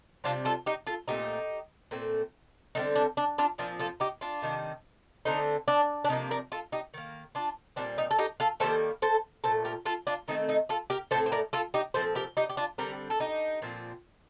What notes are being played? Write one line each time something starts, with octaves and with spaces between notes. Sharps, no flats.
C3 G3 C4 D4 F4
F4 A4
D#4 G4
F4 A4
A#2 A3 C4 D#4 G4
A#2 A3 C4
D3 G3 C4 D#4
D4
D4
D4 F4
A#2 F3 C4 D4 F4
F4 A4
D#4 G4
D4 F4
C3 D#3 G3
D3 A3 C4 D#4
D4
D4
C3 F3 A#3 D#4
A#4 D5
F4 A4
D#4 G4
D#3 A#3
D4 F4
A#2 G3 C4 D4
D#4
A4
D#4 G4
F4 A4
D#3 G3 A#3 A4 C5
A4 C5
A#2 F3 A3 A4 C5
G4 A#4
F4 A4
D4 F4
D#3 A3 C4 D#4
D#4
F4 A4
G4 A#4
A2 A3 C4 A4 C5
C5
A#4 D5
F4 A4
D#4 G4
A#2 F3 C4 A4 C5
G4 A#4
D#4 G4
G4
D4 F4
D3 G3 C4 G4 A#4
A4
D#4 G4
A#2 F3 C4